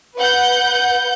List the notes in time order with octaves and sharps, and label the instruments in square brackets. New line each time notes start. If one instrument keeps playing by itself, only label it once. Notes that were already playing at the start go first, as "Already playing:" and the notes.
[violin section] B4 F#5 G6